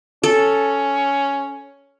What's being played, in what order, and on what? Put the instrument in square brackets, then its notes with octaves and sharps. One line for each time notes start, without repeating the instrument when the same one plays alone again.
[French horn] C#4 [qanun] A4